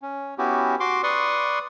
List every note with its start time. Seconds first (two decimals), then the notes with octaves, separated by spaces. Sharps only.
0.02 C#4
0.38 B3 C#4 E4 F#4 G4
0.80 F#4 C6 D6
1.03 B4 D5 C6 C#6 D#6